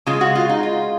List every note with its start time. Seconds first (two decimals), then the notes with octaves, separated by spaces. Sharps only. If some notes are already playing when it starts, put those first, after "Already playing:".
0.06 C#3 G#3 F4
0.21 F#4
0.35 F4
0.49 D#4
0.63 F4